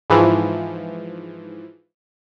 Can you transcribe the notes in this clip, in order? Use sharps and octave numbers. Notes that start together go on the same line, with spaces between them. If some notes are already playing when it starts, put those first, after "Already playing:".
G#2 E3 F3